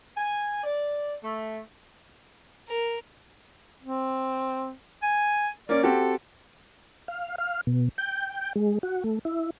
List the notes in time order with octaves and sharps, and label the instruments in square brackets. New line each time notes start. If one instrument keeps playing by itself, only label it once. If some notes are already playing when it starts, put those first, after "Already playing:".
[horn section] G#5
D5
A3
[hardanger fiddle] A#4
[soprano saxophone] C4
G#5
[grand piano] A#3 C#4 [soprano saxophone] D5
[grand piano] C4 F#4 G4 [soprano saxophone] A4
[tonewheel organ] F5
F5
B2
G5
G#3
F#4
A3
E4